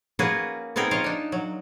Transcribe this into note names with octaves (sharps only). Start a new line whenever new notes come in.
A#3 C#4 F#4 G#4 B4
B3 C4 D#4 G#4 A#4
F4 A#4 C#5 D#5 F5
D4 D#4
F#3